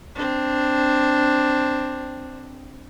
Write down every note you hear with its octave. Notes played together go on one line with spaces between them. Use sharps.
C4 D4